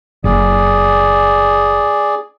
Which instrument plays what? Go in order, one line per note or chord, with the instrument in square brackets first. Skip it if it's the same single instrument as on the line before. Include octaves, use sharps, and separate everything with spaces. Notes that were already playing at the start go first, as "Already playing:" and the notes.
[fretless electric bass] F#1 [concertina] G#4 D5